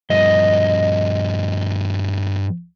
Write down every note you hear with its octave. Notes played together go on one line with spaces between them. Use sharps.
G2 F3 D#5